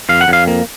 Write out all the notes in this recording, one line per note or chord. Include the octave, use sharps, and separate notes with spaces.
F2 F5
F#5
F2 F5
A#3